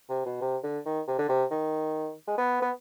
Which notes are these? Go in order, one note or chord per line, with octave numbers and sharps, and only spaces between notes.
C3
B2
C3
D3
D#3
C3
D3
C3
D#3
G#3
B3
B3